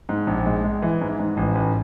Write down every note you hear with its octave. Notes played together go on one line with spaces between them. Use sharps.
G#2
A#1
G#3
G#3
E3
G#2
G#2
A1
A1